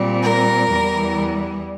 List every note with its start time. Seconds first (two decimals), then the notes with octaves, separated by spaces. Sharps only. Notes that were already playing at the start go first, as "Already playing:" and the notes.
Already playing: A#2 G3 C4
0.22 A#4
0.69 E2 E3 G3